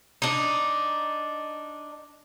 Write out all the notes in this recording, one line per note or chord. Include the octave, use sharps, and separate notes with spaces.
D4 D#4